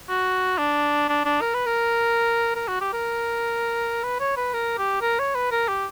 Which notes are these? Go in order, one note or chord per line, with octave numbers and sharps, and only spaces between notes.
F#4
D4
D4
D4
A#4
B4
A#4
A#4
F#4
G4
A#4
B4
C#5
B4
A#4
G4
A#4
C#5
B4
A#4
G4